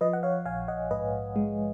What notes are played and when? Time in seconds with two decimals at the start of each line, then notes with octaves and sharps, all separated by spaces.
0.01 F3 B4 D#5
0.13 F#5
0.23 C#5 F5
0.45 A#1 F5 G#5
0.68 D#5 F#5
0.91 G#2 B4 D#5
1.36 G#3